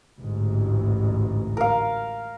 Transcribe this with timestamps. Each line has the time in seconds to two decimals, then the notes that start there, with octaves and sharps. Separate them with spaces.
0.20 A1 D2 G#2
1.57 A#4 F5